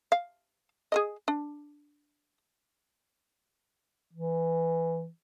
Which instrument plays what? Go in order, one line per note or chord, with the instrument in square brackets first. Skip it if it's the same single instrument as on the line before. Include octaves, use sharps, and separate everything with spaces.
[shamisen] F5
G#4 A#4 D#5
D4
[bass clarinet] E3